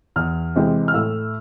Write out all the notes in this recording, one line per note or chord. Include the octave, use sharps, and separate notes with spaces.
E2 F6
C3 E3 G#3 C4
F6
A2 E6